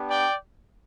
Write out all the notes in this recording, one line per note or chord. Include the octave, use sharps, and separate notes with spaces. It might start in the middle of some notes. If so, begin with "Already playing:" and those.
Already playing: B3 D4 G4
D5 G5